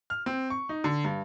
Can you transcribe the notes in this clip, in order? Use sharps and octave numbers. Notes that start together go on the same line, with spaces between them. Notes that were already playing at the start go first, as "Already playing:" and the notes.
F6
C4
C#6
D#4
D3
G2